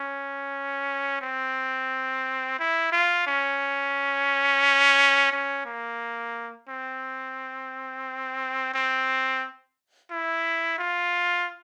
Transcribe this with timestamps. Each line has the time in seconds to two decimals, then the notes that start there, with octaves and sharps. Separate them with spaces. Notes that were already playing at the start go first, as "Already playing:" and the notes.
Already playing: C#4
1.21 C4
2.59 E4
2.92 F4
3.27 C#4
5.32 C#4
5.66 A#3
6.69 C4
8.74 C4
10.11 E4
10.79 F4